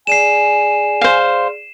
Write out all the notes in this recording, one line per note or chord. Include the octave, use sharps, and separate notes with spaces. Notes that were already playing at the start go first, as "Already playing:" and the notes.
G#4 D5 G#5 C7 D#7 E7
C5 F5